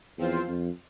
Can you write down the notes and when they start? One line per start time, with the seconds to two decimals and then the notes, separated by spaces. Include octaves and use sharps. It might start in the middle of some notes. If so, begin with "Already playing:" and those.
0.18 E2 F3 C4 F4 C5
0.48 F2